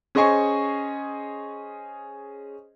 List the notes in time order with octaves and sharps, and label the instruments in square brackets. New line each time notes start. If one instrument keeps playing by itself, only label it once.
[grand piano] C#4 G#4 C5 D#5 G#5 C#6